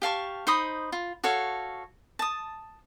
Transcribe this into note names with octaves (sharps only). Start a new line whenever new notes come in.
G4 F5 A5 C#6
D#4 C5 B5 D#6
F4
F#4 A4 C#5 F5
A5 D#6